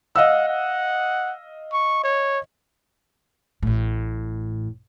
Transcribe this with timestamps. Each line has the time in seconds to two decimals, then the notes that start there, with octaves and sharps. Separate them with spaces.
0.16 D#5 F5 F#5 E6
0.49 F#5
1.73 C#6
2.04 C#5
3.63 A1 A2